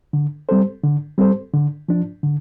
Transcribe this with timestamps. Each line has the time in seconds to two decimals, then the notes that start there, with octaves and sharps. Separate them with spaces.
0.13 D3
0.49 G3 C4 A4 C5
0.83 D3
1.18 G3 C4 A4 C5
1.54 D3
1.89 F3 D4
2.23 D3